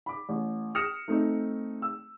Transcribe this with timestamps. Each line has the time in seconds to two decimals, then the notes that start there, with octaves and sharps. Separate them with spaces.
0.06 B5 D6
0.29 A1
0.75 D#6 F6 A#6 C#7 E7
1.08 A3 C4 D#4
1.82 E6